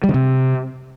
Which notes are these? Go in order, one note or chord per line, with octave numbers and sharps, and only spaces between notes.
G3
D3
C3